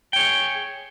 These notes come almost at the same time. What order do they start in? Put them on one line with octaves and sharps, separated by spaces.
G5 C#5 G#4